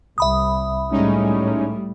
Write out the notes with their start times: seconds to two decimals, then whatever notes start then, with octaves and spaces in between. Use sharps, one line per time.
0.18 C2 E5 B5 D#6
0.91 A2 G3 G#3 C#4 D#4